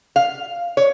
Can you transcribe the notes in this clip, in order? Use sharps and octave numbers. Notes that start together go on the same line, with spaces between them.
F5
C#5